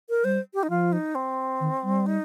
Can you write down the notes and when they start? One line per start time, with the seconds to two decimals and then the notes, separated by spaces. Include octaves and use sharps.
0.09 A#4
0.24 G3 C5
0.54 G4
0.63 D#4
0.69 F3 F4
0.92 D#4
1.15 C4
1.60 D#3
1.83 G3
2.06 D#4